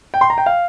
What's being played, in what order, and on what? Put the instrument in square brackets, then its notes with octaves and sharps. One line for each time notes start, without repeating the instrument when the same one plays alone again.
[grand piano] G5
C6
A#5
G5
F5